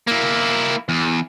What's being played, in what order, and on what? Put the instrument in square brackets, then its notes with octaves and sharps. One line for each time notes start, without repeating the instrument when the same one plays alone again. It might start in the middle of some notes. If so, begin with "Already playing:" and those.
[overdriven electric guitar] A#3 E4
E2